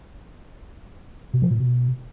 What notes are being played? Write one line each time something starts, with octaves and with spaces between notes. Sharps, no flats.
B2
F3
A#2
B2